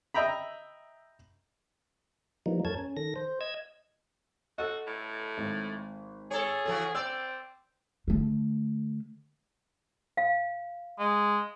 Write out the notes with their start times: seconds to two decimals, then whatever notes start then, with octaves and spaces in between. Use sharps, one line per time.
0.14 D#5 E5 G5 A#5 B5
2.46 E3 F3 G3 A#3 D#4
2.65 F#2 A4 A#4 C#5 A5 G#6
2.78 C#4
2.97 D#3 A4 A#6
3.16 C5
3.41 D#5 E6 G#6
4.58 F#4 A4 D#5
4.87 A2
5.38 G#1
6.31 G#4 A4 C#5
6.65 C#3 E3 F#4 A4
6.95 C4 D5 E6
8.08 D3 A3
10.17 F5
10.99 G#3